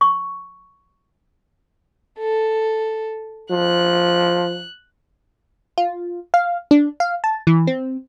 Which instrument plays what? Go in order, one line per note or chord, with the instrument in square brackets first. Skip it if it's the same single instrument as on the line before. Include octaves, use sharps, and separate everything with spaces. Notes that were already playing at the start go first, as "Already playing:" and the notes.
[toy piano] C#6
[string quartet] A4
[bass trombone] F3 [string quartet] F#6
[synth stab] F4
F5
D4
F5
A5
E3
C4